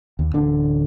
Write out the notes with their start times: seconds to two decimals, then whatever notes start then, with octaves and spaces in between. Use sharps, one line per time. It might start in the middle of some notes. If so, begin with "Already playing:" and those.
0.19 D#2
0.34 D1 A1 D3 D4